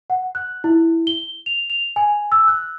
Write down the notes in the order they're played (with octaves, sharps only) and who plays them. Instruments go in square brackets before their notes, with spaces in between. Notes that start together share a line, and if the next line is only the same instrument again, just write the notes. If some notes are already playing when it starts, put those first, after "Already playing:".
[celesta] F#5
F#6
E4
G7
F7
F7
G#5
E6
F#6